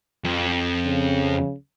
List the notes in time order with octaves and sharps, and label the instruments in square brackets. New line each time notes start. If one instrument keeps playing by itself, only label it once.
[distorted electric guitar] F2
[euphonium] C#3